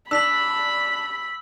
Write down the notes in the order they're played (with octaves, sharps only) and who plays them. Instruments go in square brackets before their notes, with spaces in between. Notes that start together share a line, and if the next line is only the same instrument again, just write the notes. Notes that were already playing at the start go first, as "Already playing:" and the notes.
[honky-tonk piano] D4 [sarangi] B5 [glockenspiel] E6 B6 F#7